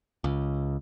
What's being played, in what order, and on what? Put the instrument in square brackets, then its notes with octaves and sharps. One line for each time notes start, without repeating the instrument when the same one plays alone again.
[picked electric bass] C#2